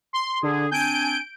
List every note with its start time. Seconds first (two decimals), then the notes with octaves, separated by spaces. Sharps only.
0.13 C6
0.43 D3 G#4
0.71 C4 D4 G#5 G6 D7